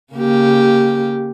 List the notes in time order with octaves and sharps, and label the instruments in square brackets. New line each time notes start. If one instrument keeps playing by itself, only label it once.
[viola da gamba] C#3 A#3 G4